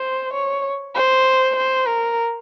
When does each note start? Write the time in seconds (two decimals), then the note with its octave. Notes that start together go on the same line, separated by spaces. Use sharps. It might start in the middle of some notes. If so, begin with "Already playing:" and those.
Already playing: C5
0.34 C#5
0.95 C5
1.56 C5
1.86 A#4